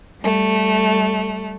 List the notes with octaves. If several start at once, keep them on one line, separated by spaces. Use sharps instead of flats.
G3 A3